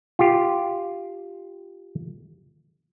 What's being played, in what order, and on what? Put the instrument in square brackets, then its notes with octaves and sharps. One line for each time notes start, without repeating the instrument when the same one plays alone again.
[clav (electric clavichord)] F4 G4